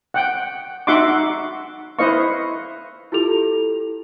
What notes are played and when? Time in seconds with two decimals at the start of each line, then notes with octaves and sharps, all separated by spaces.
0.14 F#5 G5
0.87 D#4 F#4 E5 F#5 C6 D6
1.99 E4 B4 C5 D#5 F5 C#6
3.12 E4 F4 G4 A4 F7